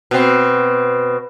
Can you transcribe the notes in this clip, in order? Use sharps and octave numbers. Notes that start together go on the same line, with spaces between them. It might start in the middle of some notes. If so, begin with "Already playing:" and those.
B2 C4